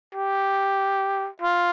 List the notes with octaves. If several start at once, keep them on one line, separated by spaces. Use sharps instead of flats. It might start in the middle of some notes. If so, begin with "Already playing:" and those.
G4
F4